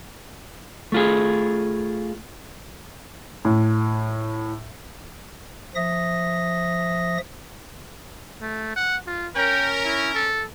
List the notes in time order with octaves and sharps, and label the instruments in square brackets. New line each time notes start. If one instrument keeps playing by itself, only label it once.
[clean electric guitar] A3 F4 G#4
[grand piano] A2
[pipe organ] F3 E5 D#6 A#6
[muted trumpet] A3
F#5
F4
[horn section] C#4 A#4 [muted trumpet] G5
[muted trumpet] E4
A4